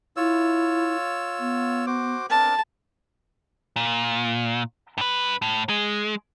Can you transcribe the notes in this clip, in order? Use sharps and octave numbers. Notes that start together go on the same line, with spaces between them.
E4 F4 C#5 E6
B3
F#4 C5 D6
C4 D4 A#4 A5
A#2
G2 B4
A2
G#3